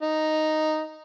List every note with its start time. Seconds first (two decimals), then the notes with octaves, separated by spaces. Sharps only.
0.02 D#4